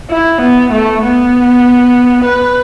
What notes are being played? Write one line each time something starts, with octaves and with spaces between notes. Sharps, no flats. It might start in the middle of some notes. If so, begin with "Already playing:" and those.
E4
B3
A3
B3
B4